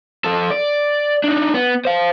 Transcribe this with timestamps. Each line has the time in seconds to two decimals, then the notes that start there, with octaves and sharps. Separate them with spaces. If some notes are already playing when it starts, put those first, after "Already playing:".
0.25 F3 A4
0.51 D5
1.24 D4 D#4
1.54 B3
1.85 C5 F5